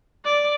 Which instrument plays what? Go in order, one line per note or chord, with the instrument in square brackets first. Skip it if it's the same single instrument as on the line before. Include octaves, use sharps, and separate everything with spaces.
[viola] D5